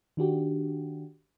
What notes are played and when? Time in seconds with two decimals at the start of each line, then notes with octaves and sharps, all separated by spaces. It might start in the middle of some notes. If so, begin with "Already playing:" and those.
0.17 D#3 D4 F#4 G4